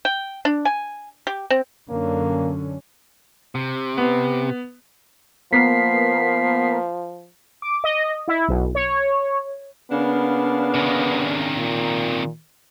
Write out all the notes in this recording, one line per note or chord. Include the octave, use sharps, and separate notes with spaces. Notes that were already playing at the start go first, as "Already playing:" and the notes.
G5
D4
G#5
G4
C4
F#2 D3 A#3 C#4
C3
B3
F3 A#3 B3 A#4 B6 C7
D6
D#5
E4
B1
C#5
C#3 A#3 B3 D4
C3 D#3
A#2